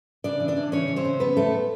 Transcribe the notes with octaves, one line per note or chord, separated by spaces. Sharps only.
C#3 D4 D5
E3
D4 D5
E3
C#3 C#4 C#5
E3
C4 C5
C#3
F2 B3 B4
F2 A3 A4